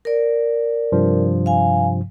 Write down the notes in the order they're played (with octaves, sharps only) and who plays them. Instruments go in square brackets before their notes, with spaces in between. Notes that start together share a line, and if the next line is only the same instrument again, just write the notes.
[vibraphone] A#4 D5
[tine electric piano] G2 C3 F3
[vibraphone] F5 G#5